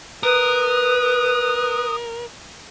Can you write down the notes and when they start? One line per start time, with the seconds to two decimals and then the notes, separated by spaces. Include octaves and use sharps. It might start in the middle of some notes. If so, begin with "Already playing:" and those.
0.23 A#4 B4 D#6